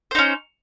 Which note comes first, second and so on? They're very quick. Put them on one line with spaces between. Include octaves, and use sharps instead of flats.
C5 D#4 C#4